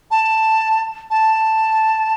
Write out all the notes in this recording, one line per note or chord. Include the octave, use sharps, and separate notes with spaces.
A5
A5